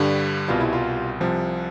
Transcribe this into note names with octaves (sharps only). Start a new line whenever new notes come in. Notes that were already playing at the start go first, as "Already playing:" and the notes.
Already playing: G2 D3 G3
C2 B2 G3 F4
E4
F4
C2 C3 F3